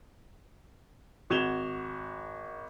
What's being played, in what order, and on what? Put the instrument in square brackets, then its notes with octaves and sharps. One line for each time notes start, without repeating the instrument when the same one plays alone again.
[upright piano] G#1 F#4 G#6 E7 F7 G7